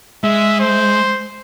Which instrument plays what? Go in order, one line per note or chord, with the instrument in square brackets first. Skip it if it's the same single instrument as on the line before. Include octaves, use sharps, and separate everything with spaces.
[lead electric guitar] G#3 [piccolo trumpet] E5
[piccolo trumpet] C5